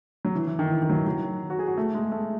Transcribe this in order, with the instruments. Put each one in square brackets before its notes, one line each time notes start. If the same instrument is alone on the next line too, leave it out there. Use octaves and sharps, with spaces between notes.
[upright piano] F#3
E3
E3
D#3
E3
D#3
F#3
E3
F#3
F#4
G#4
F#4
A3
G#3
A3